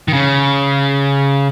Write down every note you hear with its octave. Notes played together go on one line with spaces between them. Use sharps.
D#3
C#3